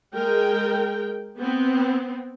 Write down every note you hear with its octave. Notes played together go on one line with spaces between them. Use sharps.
G#3 A#4 G5
B3 C4